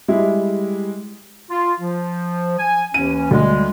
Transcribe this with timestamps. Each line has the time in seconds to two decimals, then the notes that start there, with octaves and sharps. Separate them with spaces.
0.08 G3 G#3 E4
1.50 F4
1.80 F3
2.59 G#5
2.94 D#2 E3 C#4 D#7
3.31 D2 G3 G#3